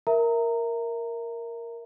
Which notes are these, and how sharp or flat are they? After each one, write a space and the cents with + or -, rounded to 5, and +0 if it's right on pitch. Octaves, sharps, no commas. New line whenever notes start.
A#4 +0 E5 +0 A#5 -20